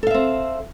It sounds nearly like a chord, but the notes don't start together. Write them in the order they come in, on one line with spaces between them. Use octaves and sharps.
A4 F5 E5 C4